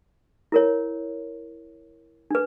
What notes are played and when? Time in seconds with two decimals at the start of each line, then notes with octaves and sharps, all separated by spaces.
0.52 E4 A#4 C#5
2.31 D4 B4